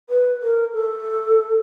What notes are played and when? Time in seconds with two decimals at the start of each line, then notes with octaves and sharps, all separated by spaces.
0.10 B4
0.42 A#4
0.74 A4